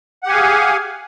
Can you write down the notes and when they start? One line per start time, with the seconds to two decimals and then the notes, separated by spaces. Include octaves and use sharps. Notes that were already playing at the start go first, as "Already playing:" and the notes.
0.23 F#5
0.26 G4
0.29 G#5
0.32 F5
0.34 G#4